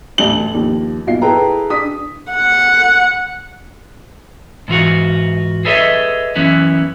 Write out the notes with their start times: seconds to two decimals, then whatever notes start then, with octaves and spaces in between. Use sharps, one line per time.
0.18 A1 D2 A4 F#7
0.54 D#2 F3
1.07 B1 F4 C7
1.22 E4 G#4 A4 B4 G5 A#5
1.70 D4 D#6 B6
2.32 F#5
4.68 G#2 E3 F4 F#4
5.65 G#4 A4 B4 C#5 D#5 E5
6.36 F#2 E3 B3 C#4 E4